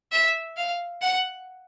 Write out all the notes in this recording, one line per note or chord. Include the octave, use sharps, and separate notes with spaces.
E5
F5
F#5